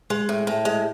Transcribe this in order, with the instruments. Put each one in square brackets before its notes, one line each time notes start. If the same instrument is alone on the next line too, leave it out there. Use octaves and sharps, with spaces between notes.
[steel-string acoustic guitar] G#3
A2
A2
G#3